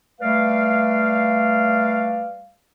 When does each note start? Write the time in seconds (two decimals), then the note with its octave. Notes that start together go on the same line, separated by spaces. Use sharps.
0.21 G3 A3 B4 D5 F5